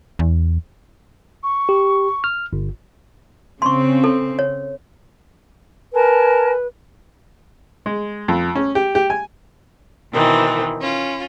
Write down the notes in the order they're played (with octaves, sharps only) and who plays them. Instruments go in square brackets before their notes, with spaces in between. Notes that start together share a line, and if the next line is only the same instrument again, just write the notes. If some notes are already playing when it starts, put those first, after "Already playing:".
[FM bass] E2
[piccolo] C#6
[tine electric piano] G4
F6
G1
[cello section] C#3 C4 [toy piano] C6 C#6
[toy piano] A4
C#5
[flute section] A#4 G#5 A5 [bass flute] B4
[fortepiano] G#3
F2
C#4
G4
G4
G#5
[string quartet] B2 D#3 E3 C4
C#4 F4